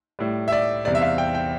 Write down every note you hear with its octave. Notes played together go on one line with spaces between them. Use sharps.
A2 G3
E5
D5
E2 C3 G3 D5
E5
F5
G5
G5